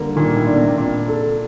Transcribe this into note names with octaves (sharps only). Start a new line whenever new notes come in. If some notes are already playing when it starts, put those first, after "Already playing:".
Already playing: D3 G3 A#3
A#2 D#3
A2
D4
C3
A#2 D4
A4